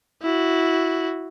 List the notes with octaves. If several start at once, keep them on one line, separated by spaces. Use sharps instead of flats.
E4 F#4